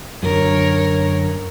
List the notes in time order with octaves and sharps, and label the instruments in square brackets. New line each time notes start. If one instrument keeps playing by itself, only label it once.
[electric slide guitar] F#2 D3 [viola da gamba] A#4 C#5